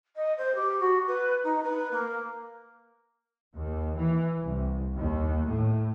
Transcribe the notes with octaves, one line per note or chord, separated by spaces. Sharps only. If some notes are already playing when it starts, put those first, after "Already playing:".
D#5
C5
G4
F#4
B4
D#4
B4
A#3
D#2
E3
C2
D#2
A2